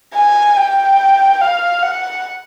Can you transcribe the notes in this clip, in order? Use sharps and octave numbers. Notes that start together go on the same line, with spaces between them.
G#5
G5
F5
F#5